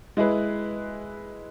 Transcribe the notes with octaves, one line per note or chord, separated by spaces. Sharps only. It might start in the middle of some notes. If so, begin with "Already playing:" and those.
G#3 E4 G#4 B4